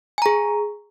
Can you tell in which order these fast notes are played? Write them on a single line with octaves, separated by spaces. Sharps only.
G#5 A#5 G#4